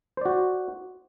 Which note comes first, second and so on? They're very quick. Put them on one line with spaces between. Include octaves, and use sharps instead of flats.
C5 D5 F#4